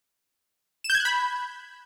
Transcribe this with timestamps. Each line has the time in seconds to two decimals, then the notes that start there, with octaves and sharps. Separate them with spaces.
0.84 E7
0.90 G6
0.95 G#6
1.00 F#6
1.05 B5